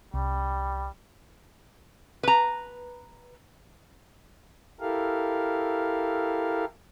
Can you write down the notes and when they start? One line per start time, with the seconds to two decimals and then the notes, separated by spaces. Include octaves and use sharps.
0.14 C2 G3
2.23 B4 A#5
4.80 E4 G4 A4 A#4 F5